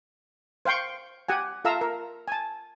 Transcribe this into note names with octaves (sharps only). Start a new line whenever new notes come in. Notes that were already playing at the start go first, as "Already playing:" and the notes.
C5 F5 G5 C6 C#6
G4 F#5 G#5
F4 A4 E5 F5 A#5 E6
A#4
G#5 A5